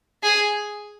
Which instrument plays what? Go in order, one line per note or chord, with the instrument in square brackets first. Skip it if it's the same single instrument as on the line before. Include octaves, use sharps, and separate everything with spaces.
[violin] G#4